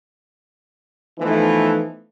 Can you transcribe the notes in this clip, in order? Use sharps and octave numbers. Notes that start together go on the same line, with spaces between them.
E3 F3 A3 B3 D#4